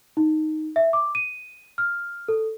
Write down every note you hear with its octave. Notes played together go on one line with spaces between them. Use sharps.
D#4
E5
D6
D#7
F6
A4